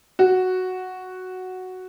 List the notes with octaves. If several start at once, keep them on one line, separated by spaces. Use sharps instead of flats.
F#4